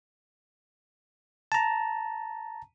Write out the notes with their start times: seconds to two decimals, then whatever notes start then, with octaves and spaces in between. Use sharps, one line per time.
1.52 A5 A#5